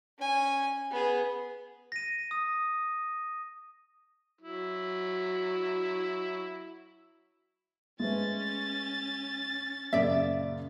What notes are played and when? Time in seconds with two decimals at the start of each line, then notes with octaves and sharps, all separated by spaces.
0.18 C#4 G#5
0.90 B3 G#4
1.92 A#6 D#7
2.31 D#6
4.41 F#3 E4
8.00 G#3 A3 C#4 B4 A6
9.93 F#2 A#2 C#3 D5 E5